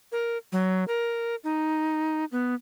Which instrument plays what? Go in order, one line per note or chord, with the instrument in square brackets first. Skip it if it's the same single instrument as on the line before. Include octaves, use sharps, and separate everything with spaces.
[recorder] A#4
F#3
A#4
D#4
B3